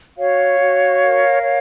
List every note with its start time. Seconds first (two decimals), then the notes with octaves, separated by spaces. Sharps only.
0.17 F#4 C#5 F5
0.60 F#4
1.01 A#4
1.43 C#5